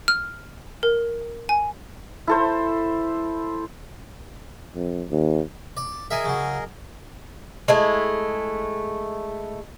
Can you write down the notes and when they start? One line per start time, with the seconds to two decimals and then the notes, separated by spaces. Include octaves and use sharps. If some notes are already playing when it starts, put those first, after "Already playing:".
0.08 F6
0.83 A#4
1.49 G#5
2.27 E4 A4 C5
4.75 F2
5.11 D#2
5.77 D5
6.11 G#4 A#4 D#5 E5 G#5
6.24 C#3 F#3
7.68 G#3 A3 E4